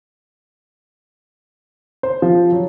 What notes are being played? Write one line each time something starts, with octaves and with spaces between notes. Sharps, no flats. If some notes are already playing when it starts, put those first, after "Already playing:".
C5
F3
F#3